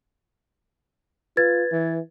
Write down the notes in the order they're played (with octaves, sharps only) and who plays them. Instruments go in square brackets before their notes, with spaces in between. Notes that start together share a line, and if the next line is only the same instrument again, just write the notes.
[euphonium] F4 [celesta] B4 G#6 A6
[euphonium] E3